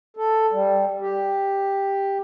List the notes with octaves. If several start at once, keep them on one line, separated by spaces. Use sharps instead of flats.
A4
G3
G4